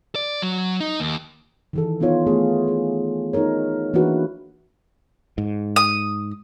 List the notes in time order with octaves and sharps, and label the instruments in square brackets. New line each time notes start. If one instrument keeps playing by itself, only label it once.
[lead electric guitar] D5
F#3
D#4
D#2
[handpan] D#3 E3 A4
E3 B3 D#4 F4 C#5
A3 B3 G#4
G#4
B3 D#4 G#4 A#4 C#5
E3 A#3 D4 E4 F#4 B4
[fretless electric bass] G#2
[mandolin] D#6